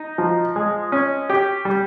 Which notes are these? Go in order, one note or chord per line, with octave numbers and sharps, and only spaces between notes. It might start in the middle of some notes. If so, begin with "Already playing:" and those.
Already playing: D#4
F3
G#3
C#4
G4
G3